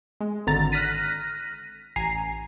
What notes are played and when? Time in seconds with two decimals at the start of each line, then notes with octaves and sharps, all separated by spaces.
0.21 G#3
0.47 G#1 D3 A#5 A6
0.72 F6 F#6 A#6 B6 D#7
1.96 A1 G#5 A#5 C7